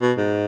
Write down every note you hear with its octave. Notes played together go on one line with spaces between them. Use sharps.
B2
G#2